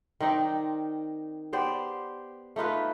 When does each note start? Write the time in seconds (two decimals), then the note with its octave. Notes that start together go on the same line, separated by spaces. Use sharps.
0.21 D#3 C4 D#4 D5
1.53 B3 G4 C5 D5
2.56 A3 D#4 F4 B4